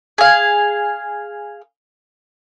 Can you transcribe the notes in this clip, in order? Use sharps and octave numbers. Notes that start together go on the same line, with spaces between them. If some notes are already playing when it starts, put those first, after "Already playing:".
G#4 F5